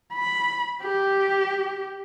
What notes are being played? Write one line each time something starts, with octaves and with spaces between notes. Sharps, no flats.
B5
G4